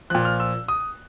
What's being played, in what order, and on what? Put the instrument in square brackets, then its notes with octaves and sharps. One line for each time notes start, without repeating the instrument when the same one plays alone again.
[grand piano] A#2 F3 F#6
F6
E6
D#6